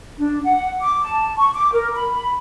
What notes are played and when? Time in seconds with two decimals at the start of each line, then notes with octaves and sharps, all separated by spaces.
0.17 D4
0.44 F#5
0.81 D6
1.03 A5
1.37 C#6
1.54 D6
1.72 A#4
1.94 B5